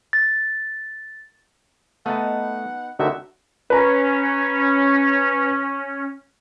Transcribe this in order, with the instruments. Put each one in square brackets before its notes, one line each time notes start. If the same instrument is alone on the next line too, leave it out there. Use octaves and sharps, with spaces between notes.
[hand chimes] A6
[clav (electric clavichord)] A3 [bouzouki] B3 D#4 A5 [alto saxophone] F#5
[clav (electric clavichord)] D2 D3 D#3 [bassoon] F#4 [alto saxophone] E5
[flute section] C#4 [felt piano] B4 A#5